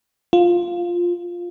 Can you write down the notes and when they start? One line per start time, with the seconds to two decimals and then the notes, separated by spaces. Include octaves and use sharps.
0.33 F4